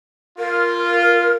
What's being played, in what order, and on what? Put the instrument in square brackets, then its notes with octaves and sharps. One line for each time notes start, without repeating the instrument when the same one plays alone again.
[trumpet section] F4 [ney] A#4